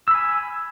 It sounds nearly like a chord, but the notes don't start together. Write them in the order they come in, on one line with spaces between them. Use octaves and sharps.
E6 B5 G#5